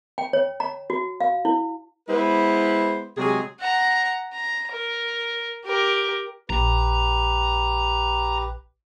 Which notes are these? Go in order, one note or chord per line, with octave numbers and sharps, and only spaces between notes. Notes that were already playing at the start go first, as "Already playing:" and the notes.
G5
C#5
A#5
F#4
F5
E4
G#3 B3 E4 B4 C5
C3 F#3 G#3 G#4
F#5 A#5
A#5
A#4
G4 A#4
A#1 G4 B4 A#5